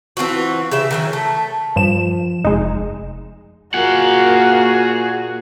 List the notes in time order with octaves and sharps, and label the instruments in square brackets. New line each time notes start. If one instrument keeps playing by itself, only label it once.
[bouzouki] E3 C4 F4 F#4
C#3 G4 E5
D#3 E3 F#3
A3
[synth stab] G2 E7 [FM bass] F3
[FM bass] F1 [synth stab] G#3 D#4
[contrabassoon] A#2 [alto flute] A#3 [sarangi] F#4 [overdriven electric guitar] G#4 F#5